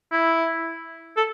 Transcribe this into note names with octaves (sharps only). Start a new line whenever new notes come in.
E4
A4